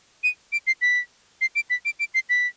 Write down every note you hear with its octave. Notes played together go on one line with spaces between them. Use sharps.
D#7
D7
C7
B6
C7
D7
B6
D7
D7
C7
B6